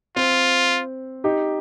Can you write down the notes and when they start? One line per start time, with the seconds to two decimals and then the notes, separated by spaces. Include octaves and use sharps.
0.16 C4 F4
1.24 D#4 G4